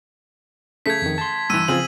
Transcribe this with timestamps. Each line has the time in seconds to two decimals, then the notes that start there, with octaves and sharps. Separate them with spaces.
0.86 C#3 A3 G#6 B6
1.02 F2 D#3
1.18 A5 C6
1.50 G2 E3 E6 D#7
1.68 C#3 F3 C4 F4 G#4 F#7